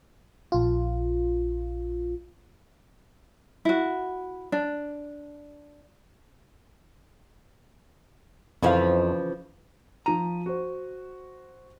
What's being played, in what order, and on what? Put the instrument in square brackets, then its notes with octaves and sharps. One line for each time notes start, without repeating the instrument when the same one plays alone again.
[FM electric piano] A#1 F4
[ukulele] E4 F#4
D4
[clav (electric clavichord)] F2 [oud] C#3 E3 F3 [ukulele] E4 F5
[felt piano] F3 D#7 [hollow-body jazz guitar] A#5
[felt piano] F#4 C5